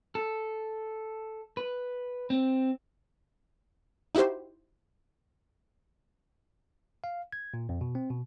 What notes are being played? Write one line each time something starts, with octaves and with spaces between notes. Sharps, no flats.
A4
B4
C4
D#4 E4 F#4 G4 C5
F5
G#6
A#2
F2
B2
C4
B2